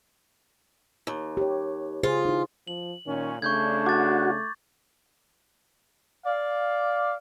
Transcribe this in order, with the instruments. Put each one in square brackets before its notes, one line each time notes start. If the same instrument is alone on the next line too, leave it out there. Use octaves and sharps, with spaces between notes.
[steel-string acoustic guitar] D#2
[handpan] G4 C#5
[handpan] C#3 G#4 C5 [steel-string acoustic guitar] F4
[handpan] D#4 E4
[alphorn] F3 [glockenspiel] F#7
[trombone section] A#2 C#4 [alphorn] D#3
[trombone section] C#3 D4 [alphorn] A3 [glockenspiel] C#6 G6 G#6
[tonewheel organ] F#4 [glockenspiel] D6 A6
[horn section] D5 F5